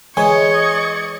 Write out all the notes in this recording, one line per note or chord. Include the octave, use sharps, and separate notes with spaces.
E3 G#3 C5 C#5 D#5 G#5 C#6 G#6